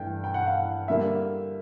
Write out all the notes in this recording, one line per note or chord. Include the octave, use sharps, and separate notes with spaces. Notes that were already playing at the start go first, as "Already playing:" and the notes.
Already playing: G2 E3 A3 G5
G5
F#5
F5
F#5
D3 G3 A#3 E5